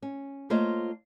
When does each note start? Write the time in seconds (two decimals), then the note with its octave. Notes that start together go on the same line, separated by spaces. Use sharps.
0.02 C#4
0.50 A3 A#3 F4 C5 C#5 D#5